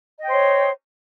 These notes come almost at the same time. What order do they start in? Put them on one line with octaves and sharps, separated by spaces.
D#5 G5 C5 C#5